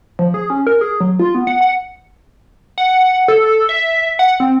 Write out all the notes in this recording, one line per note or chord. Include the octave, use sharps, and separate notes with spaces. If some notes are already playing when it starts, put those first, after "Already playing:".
F3
G#4
C#4
A#4
G#4
F#3
F4
B3
F#5
F#5
F#5
A4
E5
F#5
C4